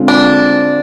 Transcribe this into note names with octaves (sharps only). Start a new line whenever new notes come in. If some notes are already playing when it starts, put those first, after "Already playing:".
Already playing: D3 G#3 C4 F4
D4